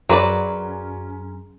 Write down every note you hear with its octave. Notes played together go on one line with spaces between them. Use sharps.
F#2 F#3 C#4 G#4 B4 D5 A#5 C6